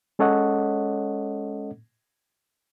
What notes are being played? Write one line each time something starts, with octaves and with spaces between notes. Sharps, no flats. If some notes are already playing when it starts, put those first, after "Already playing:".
G#3 C#4 A4 C#5 D#5 F#5